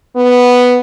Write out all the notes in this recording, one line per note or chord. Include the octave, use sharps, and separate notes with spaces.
B3